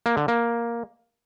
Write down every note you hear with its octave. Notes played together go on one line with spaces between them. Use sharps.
A#3
D3
A#3